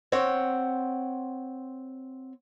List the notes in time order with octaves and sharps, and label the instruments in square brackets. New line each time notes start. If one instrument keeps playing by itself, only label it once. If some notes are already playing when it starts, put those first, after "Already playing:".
[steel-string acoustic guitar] C4 C#5 F#5 G5